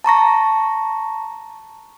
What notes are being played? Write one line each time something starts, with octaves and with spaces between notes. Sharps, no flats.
A5 A#5 C#6 A#6